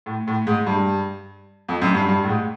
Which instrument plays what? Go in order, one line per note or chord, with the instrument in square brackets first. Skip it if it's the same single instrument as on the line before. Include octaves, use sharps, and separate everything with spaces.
[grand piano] A2
A2
G#2
G2
F2
F#2
G2
G2
A2
G#2